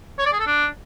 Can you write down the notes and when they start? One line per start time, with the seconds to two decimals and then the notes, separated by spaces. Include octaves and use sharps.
0.19 C#5
0.26 D5
0.33 G#4
0.39 A4
0.46 D4